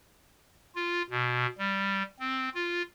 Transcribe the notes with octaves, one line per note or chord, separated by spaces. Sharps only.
F4
B2
G3
C4
F4